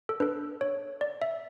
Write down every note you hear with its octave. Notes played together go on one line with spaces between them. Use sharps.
A4
D4 A4 B4
C#5
D5
E5